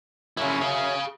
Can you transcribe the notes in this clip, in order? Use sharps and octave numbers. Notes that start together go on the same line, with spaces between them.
F#2 C#3 C#4 E4
G#4 F5